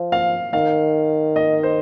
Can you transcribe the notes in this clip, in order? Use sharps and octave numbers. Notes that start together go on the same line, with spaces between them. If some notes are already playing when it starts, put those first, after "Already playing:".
Already playing: F3
F5
D#3 F5
D#5
C5